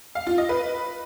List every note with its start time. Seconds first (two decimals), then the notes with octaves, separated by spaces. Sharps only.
0.15 F5
0.27 F4
0.38 D#5
0.49 B4